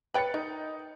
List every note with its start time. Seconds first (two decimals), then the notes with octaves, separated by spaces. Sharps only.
0.14 B4 C#5 G5 B5 A6 C#7
0.34 D#4 A#4